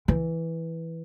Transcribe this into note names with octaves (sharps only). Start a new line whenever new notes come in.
E3